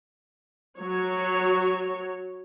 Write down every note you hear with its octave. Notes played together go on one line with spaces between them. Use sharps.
F#3 C#5